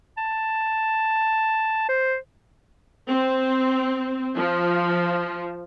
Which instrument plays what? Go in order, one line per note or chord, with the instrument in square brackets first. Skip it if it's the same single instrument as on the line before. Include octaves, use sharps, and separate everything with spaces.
[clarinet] A5
C5
[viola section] C4
F3